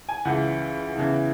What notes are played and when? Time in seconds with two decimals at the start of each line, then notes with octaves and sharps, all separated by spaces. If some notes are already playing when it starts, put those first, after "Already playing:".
0.09 G#5
0.25 C#2 C#3 E3 F#5
0.95 E2 C#3 E3